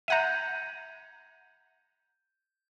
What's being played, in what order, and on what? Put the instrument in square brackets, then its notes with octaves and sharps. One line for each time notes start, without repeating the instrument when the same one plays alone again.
[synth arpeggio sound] E5 F#5 A#5 [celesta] G6 G#6 D#7